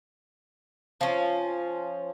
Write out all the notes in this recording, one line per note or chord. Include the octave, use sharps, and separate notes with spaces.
F3 C#4